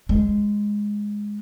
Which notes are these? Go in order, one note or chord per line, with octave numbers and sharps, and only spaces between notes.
G#3